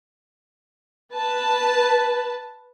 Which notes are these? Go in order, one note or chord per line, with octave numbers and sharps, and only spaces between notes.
B4 A5